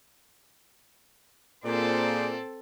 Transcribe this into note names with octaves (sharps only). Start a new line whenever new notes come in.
A#2 C4 G#4 A4 C5 D5